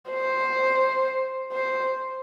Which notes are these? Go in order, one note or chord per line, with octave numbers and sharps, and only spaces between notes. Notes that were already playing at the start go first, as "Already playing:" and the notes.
C5
C5